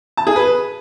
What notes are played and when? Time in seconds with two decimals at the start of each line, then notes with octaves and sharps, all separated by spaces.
0.17 A5
0.27 G#4
0.36 B4